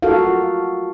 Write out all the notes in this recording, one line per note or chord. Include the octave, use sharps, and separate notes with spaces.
F4 F#4 A4 A#4 F5